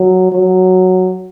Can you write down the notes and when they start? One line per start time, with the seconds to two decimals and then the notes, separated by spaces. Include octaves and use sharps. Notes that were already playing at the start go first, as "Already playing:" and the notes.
Already playing: F#3
0.32 F#3